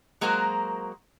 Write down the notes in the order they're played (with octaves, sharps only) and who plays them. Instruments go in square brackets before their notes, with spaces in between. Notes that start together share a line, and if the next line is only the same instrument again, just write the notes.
[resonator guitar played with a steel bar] F#3 G#3 A#3 F#4 A#4 C5